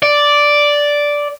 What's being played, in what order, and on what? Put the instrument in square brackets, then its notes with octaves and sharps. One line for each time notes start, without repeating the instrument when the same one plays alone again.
[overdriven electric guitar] D5